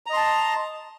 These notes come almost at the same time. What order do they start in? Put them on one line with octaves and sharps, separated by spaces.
A#5 D#5 C6 A5